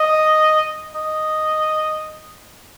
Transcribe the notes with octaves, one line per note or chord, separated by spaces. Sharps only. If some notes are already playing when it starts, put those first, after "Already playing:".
Already playing: D#5
D#5